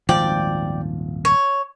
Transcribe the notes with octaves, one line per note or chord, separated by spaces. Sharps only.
D#1 G#1 F3 D5 G5
C#5